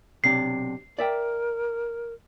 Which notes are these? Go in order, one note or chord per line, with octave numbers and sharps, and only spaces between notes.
B1 C3 D4 C7
A#4 D5 E5 G5